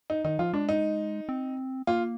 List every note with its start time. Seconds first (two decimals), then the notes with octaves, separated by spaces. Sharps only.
0.10 D#4
0.25 D#3 D#4
0.39 F3 F4
0.53 G#3 D4
0.69 D#4
1.29 C4
1.87 A#3 F4